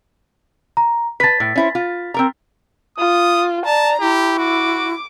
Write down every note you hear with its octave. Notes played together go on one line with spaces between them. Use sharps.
A#5
B4 A5 A6 B6
A2
C#4 E4 C5
F4
C4 A#4 A#5
F4 D#6
D5 A5 A#5
E4 G4
F#4 D6